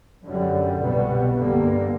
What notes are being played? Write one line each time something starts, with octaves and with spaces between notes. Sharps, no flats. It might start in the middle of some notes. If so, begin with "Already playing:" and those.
F#2 D3 G3
C2 B2 G3 B3
G2 D3 G3 A#3